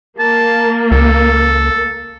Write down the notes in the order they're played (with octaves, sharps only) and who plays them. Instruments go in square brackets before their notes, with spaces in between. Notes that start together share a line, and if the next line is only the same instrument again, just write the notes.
[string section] A#3 [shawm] A5
[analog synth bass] C#2 [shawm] A4